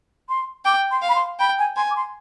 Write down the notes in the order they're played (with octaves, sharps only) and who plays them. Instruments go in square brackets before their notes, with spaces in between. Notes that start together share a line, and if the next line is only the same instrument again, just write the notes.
[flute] C6
[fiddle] G5 [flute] D6
[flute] C6
[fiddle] F5
[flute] B5
C6
[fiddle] G5 [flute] B5
[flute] G#5
[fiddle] G#5 [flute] C6
[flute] D6
C6